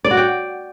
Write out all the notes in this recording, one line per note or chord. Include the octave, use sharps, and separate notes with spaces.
D5
F#4
G5